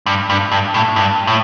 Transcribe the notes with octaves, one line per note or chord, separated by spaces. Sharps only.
G2
G2
G2
A2
G2
A2